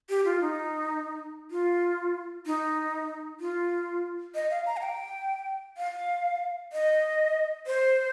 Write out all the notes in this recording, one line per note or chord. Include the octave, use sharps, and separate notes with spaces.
G4
F4
D#4
F4
D#4
F4
D#5
F5
A#5
F5
G5
F5
D#5
C5